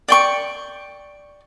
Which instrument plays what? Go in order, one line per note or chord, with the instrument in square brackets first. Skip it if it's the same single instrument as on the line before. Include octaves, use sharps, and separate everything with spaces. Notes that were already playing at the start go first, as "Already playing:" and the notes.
[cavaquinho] D5 G5 C#6